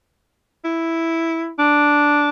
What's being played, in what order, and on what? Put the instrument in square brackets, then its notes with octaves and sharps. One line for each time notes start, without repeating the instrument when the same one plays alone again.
[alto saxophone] E4
D4